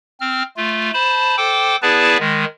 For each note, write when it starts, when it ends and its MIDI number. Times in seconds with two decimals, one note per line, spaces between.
0.20 0.43 60
0.20 0.43 89
0.57 0.91 57
0.57 0.91 65
0.94 1.36 72
0.94 1.36 81
0.94 1.36 83
1.37 1.76 69
1.37 1.76 72
1.37 1.76 79
1.37 1.76 86
1.82 2.17 59
1.82 2.17 64
1.82 2.17 68
1.82 2.17 71
1.82 2.17 74
1.82 2.17 81
2.19 2.45 51
2.19 2.45 56